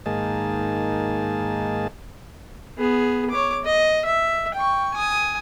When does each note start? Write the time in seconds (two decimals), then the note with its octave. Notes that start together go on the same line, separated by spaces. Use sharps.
0.06 G#2 D#3 A#3 G#4 A5
2.78 B3 G#4
3.30 C#5 D6
3.65 D#5
4.05 E5
4.54 G5 C#6
4.94 G#5 D#6